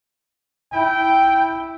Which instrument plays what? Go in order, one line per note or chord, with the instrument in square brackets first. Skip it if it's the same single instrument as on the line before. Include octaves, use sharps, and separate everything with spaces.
[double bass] E4 [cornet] G5